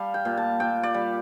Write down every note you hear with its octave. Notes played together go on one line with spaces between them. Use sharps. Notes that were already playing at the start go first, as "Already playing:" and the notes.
Already playing: G3 F5 A5
G5
A#2
A5
A#2 G5
D5
G3